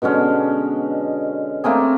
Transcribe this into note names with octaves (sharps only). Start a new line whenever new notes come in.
B2 D3 G#3 C#4
A3 A#3 C4 G#4